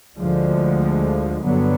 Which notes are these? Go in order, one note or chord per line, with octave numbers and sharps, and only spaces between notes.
D2 D3 F3 G#3
G2 D3 F#3 B3